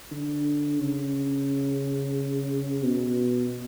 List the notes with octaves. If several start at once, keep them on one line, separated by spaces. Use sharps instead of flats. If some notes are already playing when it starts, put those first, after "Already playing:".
D3
C#3
B2